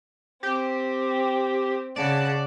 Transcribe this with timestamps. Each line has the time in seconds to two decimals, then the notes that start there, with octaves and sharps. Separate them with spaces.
0.43 C4 G4
1.96 C#3 D5 F#5 A5